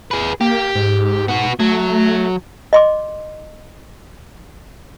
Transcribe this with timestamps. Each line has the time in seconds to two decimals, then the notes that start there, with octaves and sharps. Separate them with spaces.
0.11 G#4 B4
0.41 A#3 G4
0.75 G#2
1.28 B3 F#4
1.60 F#3 A3
2.73 D#5 C6 D6